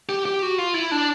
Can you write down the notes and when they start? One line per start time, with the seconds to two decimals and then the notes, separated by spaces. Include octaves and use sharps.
0.09 G4
0.25 G4
0.42 F#4
0.58 F4
0.74 E4
0.91 D4